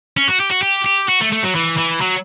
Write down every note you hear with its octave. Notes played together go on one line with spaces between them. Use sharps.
C#4
F#4
G4
F#4
G4
G4
F#4
A3
A3
F#3
E3
E3
F#3